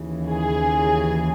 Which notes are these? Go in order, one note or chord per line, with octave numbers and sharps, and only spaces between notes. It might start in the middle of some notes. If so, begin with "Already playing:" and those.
Already playing: D#2 C#3 E3
G#4